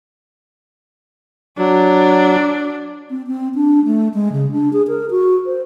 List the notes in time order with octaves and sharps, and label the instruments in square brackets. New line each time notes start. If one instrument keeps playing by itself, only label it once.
[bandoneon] F#3 [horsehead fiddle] D4
[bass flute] C4
C4
D4
A3
G#3
C#3
D4
G#4
A#4
F#4
C5